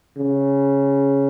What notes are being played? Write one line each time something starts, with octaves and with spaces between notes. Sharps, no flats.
C#3